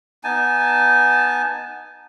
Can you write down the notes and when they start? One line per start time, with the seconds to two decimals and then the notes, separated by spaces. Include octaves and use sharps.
0.24 B3 D#4 G#5 A5